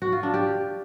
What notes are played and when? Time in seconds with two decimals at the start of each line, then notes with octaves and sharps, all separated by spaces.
0.02 F#4
0.12 F4
0.23 D4
0.34 G4